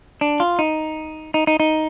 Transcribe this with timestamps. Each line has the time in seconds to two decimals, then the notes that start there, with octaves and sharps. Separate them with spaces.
0.21 D4
0.40 F4
0.59 D#4
1.34 D#4
1.47 D#4
1.60 D#4